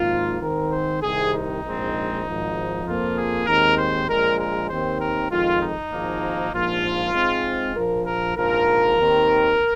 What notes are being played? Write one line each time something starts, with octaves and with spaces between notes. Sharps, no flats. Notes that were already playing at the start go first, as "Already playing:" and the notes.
Already playing: G#1 G#2 F3 A#3 F4
G#2 D#3 C4 A#4
C5
C2 C3 D#3 G#4
D#4
A#1 G#2 G#3 C4
G#1 G#2 F3
F2 F3 A#3 F4
G#4
D#2 D#3 G#3 C4 A#4
C5
A#1 A#2 G#3 A#4
A#4
D#2 D#3 C4 C5
A#4
F2 D#3 G#3 F4
D#4
G#1 G#2 F3 A#3
A#1 G#2 F3 A#3 F4
G#2 G#3 C4
A#1 A#2 F3 A#4
A#4
A#1 G#2 F3 A#4
D#2 D#3 C4